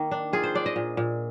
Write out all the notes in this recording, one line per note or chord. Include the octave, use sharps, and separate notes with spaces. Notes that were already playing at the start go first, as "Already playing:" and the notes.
Already playing: D#3 A#3
D4
F4 G#4
C5
D4 D5
D#5
A#2
A#2